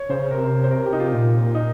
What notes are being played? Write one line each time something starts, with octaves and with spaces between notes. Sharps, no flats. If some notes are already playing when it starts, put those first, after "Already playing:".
Already playing: C#5
C#3 C5
C3 A#4
C5
A#4
G4
D#4
F4
A#2
D#4